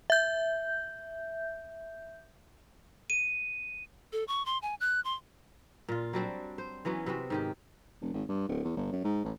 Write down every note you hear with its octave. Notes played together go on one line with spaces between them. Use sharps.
E5 G6
D#7
A4
C#6
C6
G#5
F#6
C6
A#2 F4
F#3 G3 C4 D4
C5
E3 F#3 B3 C#4
C3 B3 C4 F#4
G#2 D#3 G4
F1
G#1
G2
D1
E2
G1
F#2
G#2
A1